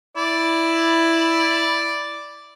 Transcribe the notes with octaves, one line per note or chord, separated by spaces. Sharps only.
E4 D5